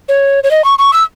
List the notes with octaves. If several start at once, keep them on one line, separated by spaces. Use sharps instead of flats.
C#5
C#5
D#5
C#6
C#6
E6